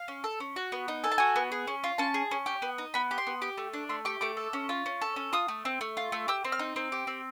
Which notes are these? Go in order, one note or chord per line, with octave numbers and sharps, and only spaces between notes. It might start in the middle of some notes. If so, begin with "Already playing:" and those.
Already playing: F5
C#4
A4
C#4
F#4
B3
D#4
A4 G#5
A5
F#4 G#5
B3
G#4
C#4
F4
C#4 A5
G#4
C#4
G4
B3
D#4
B3 B5
G4
C6
B3
G4
A3
D4
A3 C6
G4 C#6
A3 D6
A4
C#4
F4
C#4
A4
C#4
F4 D#6
A3
C4
A3
F4
A3
G4 E6
C4
F6
D#4
C4
G4
C4